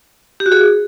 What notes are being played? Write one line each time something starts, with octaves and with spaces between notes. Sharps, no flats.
G4
F#4
G#4